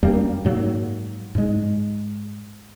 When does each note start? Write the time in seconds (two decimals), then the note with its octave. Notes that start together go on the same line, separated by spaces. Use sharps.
0.03 F#2 G3 A#3 D4
0.45 G#2 F#3 A#3
1.35 G#2 G#3